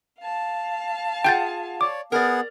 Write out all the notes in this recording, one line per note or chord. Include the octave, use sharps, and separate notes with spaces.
F5 A5
F4 G#4 F#5 G5 G6 A6
C#5 D5 D6
B3 G#4 A#4 D5 F#5